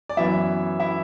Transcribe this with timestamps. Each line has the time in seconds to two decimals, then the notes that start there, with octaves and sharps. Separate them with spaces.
0.09 D5
0.17 F#2 E3 B3 E4 E5
0.80 E4 E5